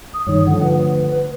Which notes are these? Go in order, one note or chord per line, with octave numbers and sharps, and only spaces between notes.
D#6
G2 D#3 C#5
D3 F3 A3 F#5
B4